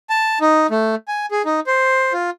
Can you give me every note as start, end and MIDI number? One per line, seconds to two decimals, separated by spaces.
0.10 0.39 81
0.41 0.67 63
0.71 0.95 57
1.08 1.26 80
1.31 1.42 68
1.45 1.60 63
1.67 2.13 72
2.13 2.30 65